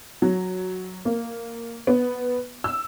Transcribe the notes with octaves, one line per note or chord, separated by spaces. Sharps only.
F#3
A#3
B3
E6